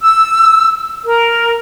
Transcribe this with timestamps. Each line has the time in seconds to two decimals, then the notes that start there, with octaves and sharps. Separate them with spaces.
0.01 E6
1.05 A#4